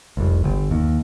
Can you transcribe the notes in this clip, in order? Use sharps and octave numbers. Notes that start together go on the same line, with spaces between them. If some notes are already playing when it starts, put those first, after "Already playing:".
F1 C2
G1
D#2